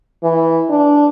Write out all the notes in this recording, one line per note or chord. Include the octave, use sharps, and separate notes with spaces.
E3
D4